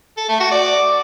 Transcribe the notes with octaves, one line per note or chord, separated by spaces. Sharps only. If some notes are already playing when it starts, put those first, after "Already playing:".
A4
A3
F#4
D5